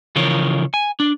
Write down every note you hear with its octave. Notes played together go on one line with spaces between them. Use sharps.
C#3 E3 F3 A#4 C#5
G#5
D4